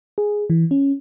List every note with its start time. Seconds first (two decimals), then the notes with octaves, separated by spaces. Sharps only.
0.18 G#4
0.50 E3
0.71 C#4